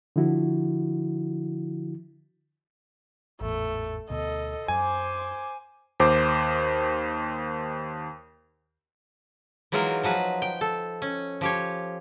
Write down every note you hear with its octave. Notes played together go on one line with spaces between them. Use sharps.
D3 F3 E4 F#4
G#1 E2 A2 A3
D2 B2 A4 D#5
F#2 C5 G#5 D6
D#2 C5 D6
E3 F#3 G#3 D#4 F4 A#4
F3 F#3 B4
G5
A4
C#4
F3 G4 C#5